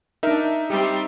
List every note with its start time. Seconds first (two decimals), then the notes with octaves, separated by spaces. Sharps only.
0.23 D4 D#4 A#4 E5
0.70 G3 C4 G4